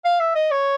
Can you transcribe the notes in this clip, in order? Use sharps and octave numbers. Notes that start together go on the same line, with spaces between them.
F5
E5
D#5
C#5